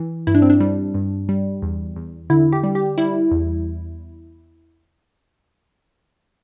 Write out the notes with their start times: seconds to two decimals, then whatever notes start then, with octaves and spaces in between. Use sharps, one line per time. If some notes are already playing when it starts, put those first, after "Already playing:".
Already playing: E3
0.27 G2 E4
0.35 D4
0.42 C4
0.50 D4
0.60 G3
0.94 G2
1.29 G3
1.62 E2
1.96 E2
2.30 D3 E4
2.53 G4
2.64 G3
2.75 G4
2.98 G3 E4
3.31 E2